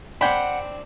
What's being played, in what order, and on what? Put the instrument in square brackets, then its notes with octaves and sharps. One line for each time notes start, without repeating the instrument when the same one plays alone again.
[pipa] G#3 G5 B5 [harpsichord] C4 D4 [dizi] F#5